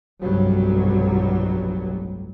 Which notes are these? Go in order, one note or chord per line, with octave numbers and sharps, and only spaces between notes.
F1 B1 G2 F#3 G3